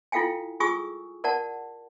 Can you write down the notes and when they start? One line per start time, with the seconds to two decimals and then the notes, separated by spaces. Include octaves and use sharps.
0.12 E4 F4 A4 F5 G5 G#5
0.60 F4 G#4 G#5 C#6 D#6 E6
1.24 A#4 D5 F#5 A5